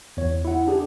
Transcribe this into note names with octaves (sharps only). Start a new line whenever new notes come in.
E2 C#5
E4 F#5
D4 G4 G#4